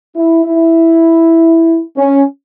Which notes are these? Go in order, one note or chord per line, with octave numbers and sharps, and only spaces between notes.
E4
E4
C#4